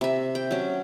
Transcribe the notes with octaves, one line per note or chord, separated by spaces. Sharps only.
C3 E5
G5
F#3 C#4